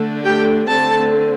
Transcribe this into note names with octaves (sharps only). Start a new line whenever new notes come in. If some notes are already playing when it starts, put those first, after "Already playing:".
Already playing: D3 A3 D4
G4 G5
D3 A3 C4 A4 A5